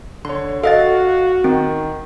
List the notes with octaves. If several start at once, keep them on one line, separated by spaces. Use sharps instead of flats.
D3 C#5 C6
F#4 A4 D#5 F5 F#5 A6
D#3 C4